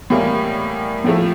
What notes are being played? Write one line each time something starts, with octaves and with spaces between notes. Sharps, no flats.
A2 E3 G3 A#3
A2 F3 A3